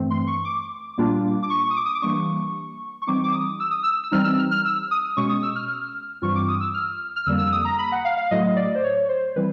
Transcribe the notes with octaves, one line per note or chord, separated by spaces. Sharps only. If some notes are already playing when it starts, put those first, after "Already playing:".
Already playing: G2 E3 A3 C4
C6
C#6
D6
A#2 G3 A#3 D4 F4
D6
C#6
D#6
D6
D#6
D6
E3 G3 A#3 D4 C#6
C#6
E3 G3 C4 D#4 D6
D6
D#6
E6
D#6
E6
E6
E3 G3 C4 D#4 F6
E6
F6
F6
E6
D#6
B2 G#3 C#4 C#6
D#6
E6
F6
F6
G2 E3 G3 C4 F4 C#6
D6
D#6
E6
F6
F6
F2 D3 G3 A#3 E6
E6
D#6
A#5
B5
F#5
F5
F5
A2 F#3 A3 D#5
D5
C5
C#5
C5
E3 G3 C4 B4